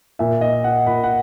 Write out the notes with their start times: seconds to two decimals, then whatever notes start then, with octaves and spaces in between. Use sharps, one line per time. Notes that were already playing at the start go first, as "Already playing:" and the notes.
0.19 A#2 E5
0.41 D#5
0.64 F#5
0.86 A#2 B5
1.04 F#5